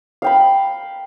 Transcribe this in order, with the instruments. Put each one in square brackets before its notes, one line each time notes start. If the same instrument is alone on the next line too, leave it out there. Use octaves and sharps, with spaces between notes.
[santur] F5 G5 B5